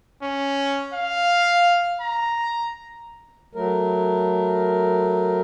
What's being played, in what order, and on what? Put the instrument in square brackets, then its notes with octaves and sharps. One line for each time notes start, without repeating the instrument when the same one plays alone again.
[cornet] C#4
F5
A#5
[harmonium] F#3 A3 A#4